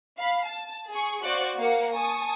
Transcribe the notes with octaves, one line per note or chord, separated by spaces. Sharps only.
F5 B5
A5
G#4 C#6
F#4 C5 D5 F5 C#6 F#6
A#3 A#4 F5 F#5 C#7
G#5 A5 C#6 D#6